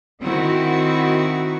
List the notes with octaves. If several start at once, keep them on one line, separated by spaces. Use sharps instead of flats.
D#3 C4 E4 F#4